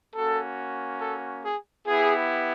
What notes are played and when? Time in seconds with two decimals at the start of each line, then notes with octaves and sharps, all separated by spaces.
0.14 A#3 C#4 F#4 A4
1.01 A4
1.45 G#4
1.87 B3 E4 G4 G#4